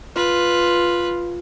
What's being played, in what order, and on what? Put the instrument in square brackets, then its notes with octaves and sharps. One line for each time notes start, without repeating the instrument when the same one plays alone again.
[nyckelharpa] F4 [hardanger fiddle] B4